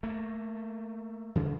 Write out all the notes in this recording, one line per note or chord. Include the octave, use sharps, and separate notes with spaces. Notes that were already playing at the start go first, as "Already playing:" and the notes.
A3 A#3
D2 C#3 E3